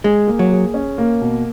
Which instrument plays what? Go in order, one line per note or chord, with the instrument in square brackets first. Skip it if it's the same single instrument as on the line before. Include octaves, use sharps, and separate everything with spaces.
[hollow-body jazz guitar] G#3 [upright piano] G#4
[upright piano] A#3
[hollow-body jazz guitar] F#3
[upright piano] G#4
C#4
A#3
B2